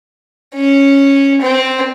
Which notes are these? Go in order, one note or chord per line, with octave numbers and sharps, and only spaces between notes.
C#4
C4